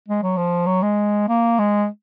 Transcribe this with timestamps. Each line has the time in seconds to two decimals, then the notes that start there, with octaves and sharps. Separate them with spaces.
0.08 G#3
0.22 F#3
0.37 F3
0.66 F#3
0.82 G#3
1.28 A#3
1.59 G#3